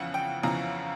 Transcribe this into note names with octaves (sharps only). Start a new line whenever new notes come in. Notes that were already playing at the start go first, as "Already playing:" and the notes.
Already playing: F2 C#3 E3 F#5
G5
F2 C#3 E3 A#5